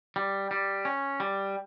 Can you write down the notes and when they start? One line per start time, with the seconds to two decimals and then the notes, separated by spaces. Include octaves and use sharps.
0.16 G3
0.51 G3
0.85 C#4
1.20 G3